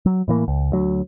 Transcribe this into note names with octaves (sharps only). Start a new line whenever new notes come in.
F#3
A2 E3 A#3
C#2
D2 F#3